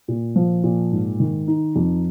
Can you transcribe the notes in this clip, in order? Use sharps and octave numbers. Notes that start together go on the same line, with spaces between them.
A#2
F3
A#2
G#2
D#3
D#4
F2